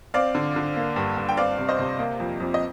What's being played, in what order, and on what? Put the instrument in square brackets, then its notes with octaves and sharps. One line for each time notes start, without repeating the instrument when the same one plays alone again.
[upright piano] C4 D5 F5
D3
D3
A#3
G2
G2
G5
C4 D5 F5
C3
C5 D#5
C3
A#3
F2
F2
D#5